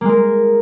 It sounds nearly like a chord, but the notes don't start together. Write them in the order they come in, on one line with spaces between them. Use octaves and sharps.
A#3 G#3 A#4